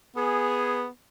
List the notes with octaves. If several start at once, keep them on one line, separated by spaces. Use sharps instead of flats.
B3 G#4